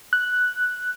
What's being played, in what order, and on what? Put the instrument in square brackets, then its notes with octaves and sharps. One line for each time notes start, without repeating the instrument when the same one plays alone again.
[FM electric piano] F#6